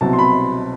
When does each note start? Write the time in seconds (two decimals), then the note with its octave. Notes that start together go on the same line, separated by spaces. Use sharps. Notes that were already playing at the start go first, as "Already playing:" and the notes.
0.01 C2 B2 F#3 C4 A5
0.13 C6
0.19 B5